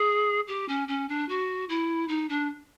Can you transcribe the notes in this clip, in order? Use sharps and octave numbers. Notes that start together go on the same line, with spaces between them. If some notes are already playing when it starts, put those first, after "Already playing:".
Already playing: G#4
G4
C#4
C#4
D4
F#4
E4
D#4
D4